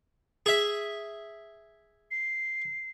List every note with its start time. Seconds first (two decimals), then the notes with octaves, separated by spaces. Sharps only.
0.46 G#4 E5
2.11 C7